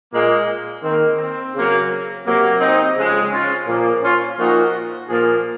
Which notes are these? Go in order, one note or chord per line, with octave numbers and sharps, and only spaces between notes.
A#2 G#3 A#3
D#3 A#3 C4
C4
C#3 F#3 A#3
C3 F#3 A#3
C4 D#4
C#3 F3 G#3
C#4 F4
A#2 F3 A#3
C#4 F4
A#2 F3 A#3 D#4 F#4
A#2 F3 A#3 F4 G#4